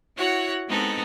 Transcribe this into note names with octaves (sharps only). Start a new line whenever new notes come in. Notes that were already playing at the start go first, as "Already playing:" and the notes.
E4 F#4 C#5 F#5
G#3 B3 C4 D#4 A4